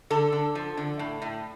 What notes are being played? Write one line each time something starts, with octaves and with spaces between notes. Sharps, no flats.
D3 A4
D3
F3
D3
A2
A2